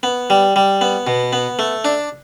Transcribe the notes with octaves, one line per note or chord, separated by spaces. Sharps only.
B3
G3
G3
B3
B2
B3
A3
D4